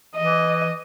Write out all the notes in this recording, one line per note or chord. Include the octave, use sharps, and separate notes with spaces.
E3 D#5